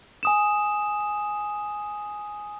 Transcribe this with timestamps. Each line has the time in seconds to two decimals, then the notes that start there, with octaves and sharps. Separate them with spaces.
0.23 G#5 D#6 E7